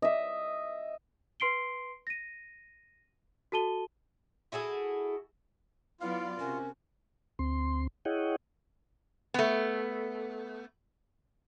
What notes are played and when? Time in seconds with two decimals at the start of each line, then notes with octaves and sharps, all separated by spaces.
0.02 D#5 E5
1.40 B4 C6 C7 D7 G7
2.07 A#6 D#7
3.52 F#4 A4 A5 D#7 G7
4.52 E4 F#4 G#4 A4
6.01 F#3 B3 E4 F4 D5 F5
6.39 C3 C#4 F#4 A#4
7.39 D2 C4 C6
8.05 E4 G#4 C#5 D#5 F#5 G5
9.34 A3 B3